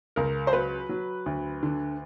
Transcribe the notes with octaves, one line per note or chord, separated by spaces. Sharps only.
C#2 A#4
C5
F#3 B4
F#3
D2
D3